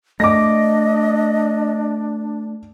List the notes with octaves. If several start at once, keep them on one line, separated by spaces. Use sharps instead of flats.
A3 D4 D#5 D6 A#6